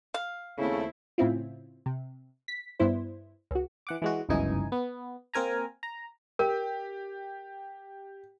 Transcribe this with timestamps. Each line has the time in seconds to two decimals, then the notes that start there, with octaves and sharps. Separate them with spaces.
0.14 F5
0.58 D#2 C#3 A3 C4 E4
1.18 A2 C#3 C4 E4 F4
1.86 C3
2.48 B6
2.80 G2 B3 E4 C5
3.51 C#2 F#4
3.87 E3 F#5 D6
4.02 E3 G#3 F#4
4.29 G1 C#2 F#2 E3 D#4 G#5
4.72 B3
5.34 A#3 C4 A#4 G#5 A#5
5.83 A#5
6.39 G4 A#4